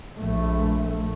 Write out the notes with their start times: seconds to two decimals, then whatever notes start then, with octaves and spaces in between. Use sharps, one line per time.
0.18 A#1 A3